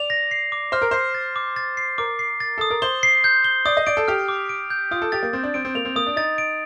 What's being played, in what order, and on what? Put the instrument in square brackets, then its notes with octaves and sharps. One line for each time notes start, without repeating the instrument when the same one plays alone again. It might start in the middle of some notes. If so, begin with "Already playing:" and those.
Already playing: [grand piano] D5 [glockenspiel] F7
[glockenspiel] A#6
C7
D6
[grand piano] C5 [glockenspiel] F6
[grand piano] A#4
[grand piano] C5 [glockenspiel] C7
[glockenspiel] A6
D6
A6
C7
[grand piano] A#4 [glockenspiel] D6
[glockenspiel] C7
A6
[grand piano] A4 [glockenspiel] D#6
[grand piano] A#4
[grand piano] C5 [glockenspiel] G7
[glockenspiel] C7
G6
G7
[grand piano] D5 [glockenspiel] D#6
[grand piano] D#5
[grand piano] D5 [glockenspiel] D7
[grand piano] A4
[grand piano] G4 [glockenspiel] F6
[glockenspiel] D6
D7
G6
[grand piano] F4 [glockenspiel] D#6
[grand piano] A4
[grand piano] G4 [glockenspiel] A6
[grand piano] A#3
[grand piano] C4 [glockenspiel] A6
[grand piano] D4
[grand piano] C4 [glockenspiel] D7
[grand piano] C4
[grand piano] A#3 [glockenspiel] F7
[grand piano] C4
[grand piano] A#3 [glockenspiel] D#6
[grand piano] D4
[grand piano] D#4 [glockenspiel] A6
[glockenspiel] D7